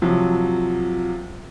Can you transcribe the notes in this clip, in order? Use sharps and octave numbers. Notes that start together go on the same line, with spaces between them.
C3 F3 F#3